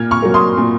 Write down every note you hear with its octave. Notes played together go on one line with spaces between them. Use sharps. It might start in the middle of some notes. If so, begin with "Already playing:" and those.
Already playing: A#2 F6 G#6
C#6 F6
F#3 A#3
C6 D#6
A#2